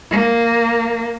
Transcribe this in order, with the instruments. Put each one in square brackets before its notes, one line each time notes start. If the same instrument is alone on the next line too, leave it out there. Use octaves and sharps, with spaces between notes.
[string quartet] A#3